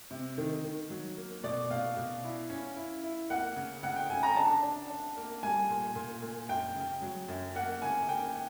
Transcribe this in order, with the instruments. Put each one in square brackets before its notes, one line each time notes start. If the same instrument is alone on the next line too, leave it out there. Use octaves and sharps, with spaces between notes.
[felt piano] C3
D#3
D#3
F#3
A#3
[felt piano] B2 [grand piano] D5
[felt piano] B2 [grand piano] F5
[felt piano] B2
E4
C#4
E4
E4
[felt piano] A#3 [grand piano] F#5
[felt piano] C#3
[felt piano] C#3 [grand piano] F#5
[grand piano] G5
[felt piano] C#3 [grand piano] G#5
[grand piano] A#5
[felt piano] D4 [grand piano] A5
[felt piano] D4
D4
A#3
[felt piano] G3 [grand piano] G#5
[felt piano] A#2
A#2
A#2
[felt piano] F#2 [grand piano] G5
[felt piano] C#3
F#3
F#2
[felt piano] A#3 [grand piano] F#5
[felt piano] C#3 [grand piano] G#5
[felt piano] A#3 [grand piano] G5